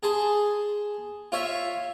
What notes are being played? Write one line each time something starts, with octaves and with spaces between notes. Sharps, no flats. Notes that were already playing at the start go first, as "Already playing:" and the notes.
G#4 A5 C6
F4 C#5 E5